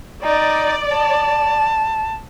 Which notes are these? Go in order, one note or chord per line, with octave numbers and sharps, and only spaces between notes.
D#4 D5
A5